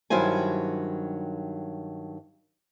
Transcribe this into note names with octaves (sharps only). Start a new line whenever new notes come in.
G2 D#3 F#3 E4 C5 G#5